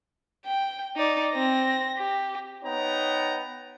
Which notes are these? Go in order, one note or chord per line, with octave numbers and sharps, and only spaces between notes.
G5
D#4 D5
C4 A#6
G4
B3 D#4 C#5 G5 A#5